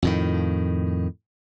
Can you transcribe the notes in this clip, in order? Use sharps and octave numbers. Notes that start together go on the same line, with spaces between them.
F2 A2 D#3